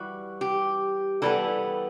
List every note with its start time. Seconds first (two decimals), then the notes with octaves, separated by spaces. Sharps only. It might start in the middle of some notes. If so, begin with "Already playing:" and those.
Already playing: E3 G3 F#4
0.41 G4
1.22 E3 G3 B3 A4